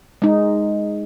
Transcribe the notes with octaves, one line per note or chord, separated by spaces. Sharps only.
G#3 D#4